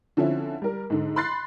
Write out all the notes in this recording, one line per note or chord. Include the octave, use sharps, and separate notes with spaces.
D3 F3 C4 C#4 E4
G3 A#4
G#2 D3
B5 C6 F#6 A6 C7